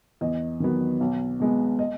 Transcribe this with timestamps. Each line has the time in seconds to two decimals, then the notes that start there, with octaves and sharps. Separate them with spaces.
0.21 E2 D#5
0.60 D#3 F#3 B3
1.00 B1
1.40 B2 G#3 B3
1.79 D#5